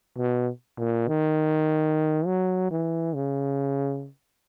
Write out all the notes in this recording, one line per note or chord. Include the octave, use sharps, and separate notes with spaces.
B2
A#2
D#3
F#3
E3
C#3